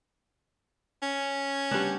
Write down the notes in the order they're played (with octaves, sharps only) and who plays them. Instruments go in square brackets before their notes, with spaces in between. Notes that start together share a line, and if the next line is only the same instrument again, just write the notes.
[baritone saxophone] C#4
[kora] G3 B3 D4